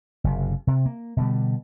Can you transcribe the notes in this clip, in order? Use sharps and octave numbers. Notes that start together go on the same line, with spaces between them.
F#1 C3
C3
A#3
B2 D3 G3